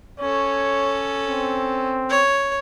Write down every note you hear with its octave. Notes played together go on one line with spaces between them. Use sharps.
C#4 A4 C#5
C4
C#5